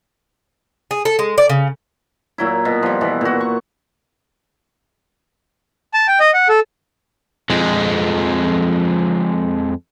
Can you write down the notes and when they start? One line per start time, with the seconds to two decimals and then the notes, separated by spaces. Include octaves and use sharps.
0.91 G#4
1.05 A4
1.19 G#3
1.38 D5
1.49 C#3
2.38 A#2 F#3 E4
2.65 B2 B3
2.83 F3 G3
3.01 B2 E3
3.21 A#2 F#4
3.41 C#6
5.94 A5
6.08 G5
6.20 D#5
6.34 F#5
6.49 A4
7.50 F2 G#3